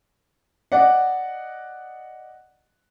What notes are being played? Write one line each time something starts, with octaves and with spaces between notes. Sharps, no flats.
D5 D#5 F#5